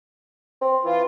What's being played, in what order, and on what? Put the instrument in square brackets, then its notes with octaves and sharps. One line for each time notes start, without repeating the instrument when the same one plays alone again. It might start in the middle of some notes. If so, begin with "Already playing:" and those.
[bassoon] C4
[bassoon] E3 [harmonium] F4